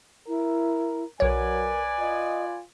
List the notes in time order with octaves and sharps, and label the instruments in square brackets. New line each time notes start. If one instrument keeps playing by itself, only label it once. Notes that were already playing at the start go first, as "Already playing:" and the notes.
[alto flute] E4 [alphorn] A#4
[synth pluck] B1 C#5 [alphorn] F#3 [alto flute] A#4 [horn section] B4 D5 G#5
[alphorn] F4 [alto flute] D#5